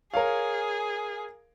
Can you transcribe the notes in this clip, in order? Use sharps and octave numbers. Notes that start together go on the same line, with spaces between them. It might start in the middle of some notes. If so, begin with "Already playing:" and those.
G#4 A#4 C#5 F5